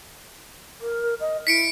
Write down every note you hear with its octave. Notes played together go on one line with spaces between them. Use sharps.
A#4
D#5
E4 B6 C#7 D7